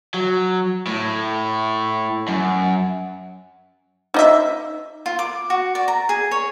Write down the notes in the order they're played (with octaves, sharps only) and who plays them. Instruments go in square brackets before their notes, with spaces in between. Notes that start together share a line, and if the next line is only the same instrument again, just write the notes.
[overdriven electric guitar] F#3
A2
F#2
[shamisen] D#4 D#5 E5
[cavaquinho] F4
D6
F#4
D5
A#5
G#4
C#5